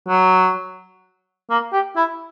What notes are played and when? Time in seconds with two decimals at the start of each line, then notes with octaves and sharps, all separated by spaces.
0.08 F#3
1.50 A#3
1.73 G4
1.97 E4